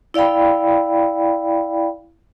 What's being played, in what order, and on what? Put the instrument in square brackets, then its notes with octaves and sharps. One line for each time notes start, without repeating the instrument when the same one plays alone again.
[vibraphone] E4 D5 F5 G5 B5